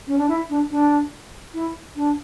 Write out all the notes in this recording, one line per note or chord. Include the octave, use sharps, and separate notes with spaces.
C#4
D4
E4
D4
D4
E4
D4